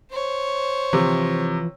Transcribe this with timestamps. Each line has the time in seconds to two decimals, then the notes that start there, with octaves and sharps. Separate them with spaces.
0.11 C5 C#5
0.93 C3 E3 F3